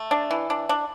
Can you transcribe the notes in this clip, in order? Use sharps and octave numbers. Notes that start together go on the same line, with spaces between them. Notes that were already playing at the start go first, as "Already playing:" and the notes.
Already playing: A3
D4
E3
D4
D4